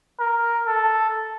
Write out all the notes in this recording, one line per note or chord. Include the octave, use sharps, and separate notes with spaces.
A#4
A4